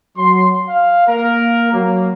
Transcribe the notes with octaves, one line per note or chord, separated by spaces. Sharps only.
F#3 C6
F5
A#3 A#4
F#3 A#3